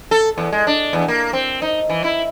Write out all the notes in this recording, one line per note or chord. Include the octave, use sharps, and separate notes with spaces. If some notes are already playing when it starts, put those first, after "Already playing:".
A4
E2
G#3
D4
E2
A#3
C4
D#4
E3
E4